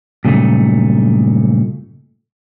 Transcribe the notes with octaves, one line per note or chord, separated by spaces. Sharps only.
G2 A#2 C#3 F#3 A3 D#4